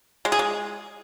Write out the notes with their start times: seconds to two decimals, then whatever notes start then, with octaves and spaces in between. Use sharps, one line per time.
0.25 G#3
0.32 G#4
0.39 G#3